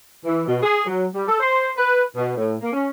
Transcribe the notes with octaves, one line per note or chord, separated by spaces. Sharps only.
E3
B2
G#4
F#3
G3
A4
C5
B4
B2
A2
A#3
C#4